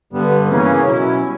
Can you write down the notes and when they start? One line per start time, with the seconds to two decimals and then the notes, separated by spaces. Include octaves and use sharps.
0.13 G2 D3 G3 B3
0.49 C#3 E3 A#3 C#4
0.86 B2 F#3 C#4 E4
1.21 G3 C#4